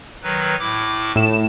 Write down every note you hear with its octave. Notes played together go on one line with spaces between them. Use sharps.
D#3 F#3 B4
A2 E4 D6
A2 E7